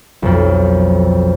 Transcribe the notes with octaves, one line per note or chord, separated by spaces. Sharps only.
B1 F2